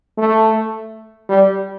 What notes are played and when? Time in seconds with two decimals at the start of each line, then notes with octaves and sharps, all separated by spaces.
0.18 A3
1.29 G3